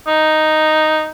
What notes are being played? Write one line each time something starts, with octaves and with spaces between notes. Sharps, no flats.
D#4